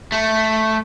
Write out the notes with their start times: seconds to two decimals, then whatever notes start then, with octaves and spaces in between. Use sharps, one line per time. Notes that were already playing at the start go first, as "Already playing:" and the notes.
0.12 A3